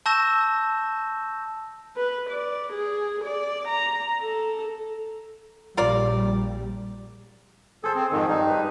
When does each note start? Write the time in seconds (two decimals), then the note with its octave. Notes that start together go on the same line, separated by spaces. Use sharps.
0.06 A5 C#6 E6 G6 A#6 E7
1.97 B4
2.30 D5
2.73 G#4
3.24 D5
3.68 A#5
4.22 A4
5.77 A#1 G3 F4 A#4 D5
7.84 G#4 A4 C5 A5
7.95 C4
8.12 F2 G#2 D#3
8.29 G2 D#4
8.49 B4 D#5